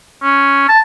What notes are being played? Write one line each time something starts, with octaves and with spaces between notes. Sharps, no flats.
C#4
A5